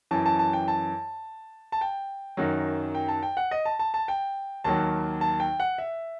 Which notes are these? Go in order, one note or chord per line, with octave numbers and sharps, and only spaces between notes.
F#2 E3 A5
A5
A5
G5
A5
A5
G5
F#2 D#3 F#3
G5
A5
G5
F#5
D#5
A5
A5
A5
G5
D#2 D#3 F#3 A5
A5
G5
F#5
E5